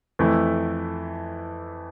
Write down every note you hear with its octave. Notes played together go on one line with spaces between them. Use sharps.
F2 E3 A3 E4